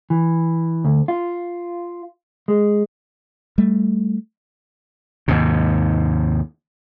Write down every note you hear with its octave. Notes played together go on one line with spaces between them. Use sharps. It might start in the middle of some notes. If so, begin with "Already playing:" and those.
E3
D2
F4
G#3
G3 A3
D#2 G#2 C3